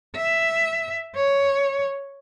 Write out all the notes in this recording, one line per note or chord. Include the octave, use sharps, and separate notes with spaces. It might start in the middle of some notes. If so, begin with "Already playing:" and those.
E5
C#5